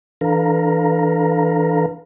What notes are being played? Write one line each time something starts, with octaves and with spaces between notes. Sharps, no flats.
E3 D4 A4 B4 F5 A#5